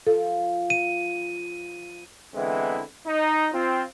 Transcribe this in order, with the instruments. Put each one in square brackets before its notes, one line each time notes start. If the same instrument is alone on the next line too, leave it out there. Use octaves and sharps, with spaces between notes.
[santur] F3 [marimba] A4
[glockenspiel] D#7
[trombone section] D3 E3 G#3 B3 C4 E4
D#4
C4 F4